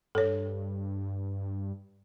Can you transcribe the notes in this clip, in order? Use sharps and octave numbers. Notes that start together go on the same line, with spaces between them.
G2 A4 C#5